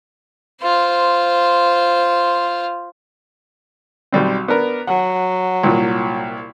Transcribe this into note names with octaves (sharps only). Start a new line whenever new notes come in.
F4 C5
B1 G3 C4
B3 D4 A#4
F#3 F#5
C2 A#2